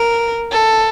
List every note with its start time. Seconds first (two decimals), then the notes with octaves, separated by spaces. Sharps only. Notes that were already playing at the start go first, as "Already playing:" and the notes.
Already playing: A#4
0.52 A4